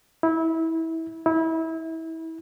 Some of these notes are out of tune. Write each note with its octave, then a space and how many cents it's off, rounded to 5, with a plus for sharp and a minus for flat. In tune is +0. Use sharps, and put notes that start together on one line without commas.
E4 -25
E4 -30